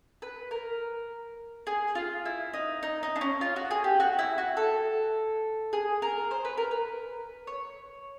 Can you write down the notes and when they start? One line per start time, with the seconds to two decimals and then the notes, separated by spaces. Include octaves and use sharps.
0.22 B4
0.51 A#4
1.67 G#4
1.95 F4
2.26 E4
2.54 D#4
2.83 D#4
3.03 D#4
3.16 D4
3.21 C#4
3.41 F4
3.56 F#4
3.71 G#4
3.84 G4
4.00 F#4
4.19 E4
4.38 F#4
4.57 A4
5.73 G#4
6.02 A#4
6.31 C5
6.45 B4
6.58 A#4
6.71 B4
7.47 C#5